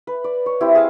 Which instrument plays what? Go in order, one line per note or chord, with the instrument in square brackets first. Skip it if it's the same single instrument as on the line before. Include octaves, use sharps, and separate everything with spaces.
[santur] B4
D5
C#5
C4 E4 G4
G#4 F5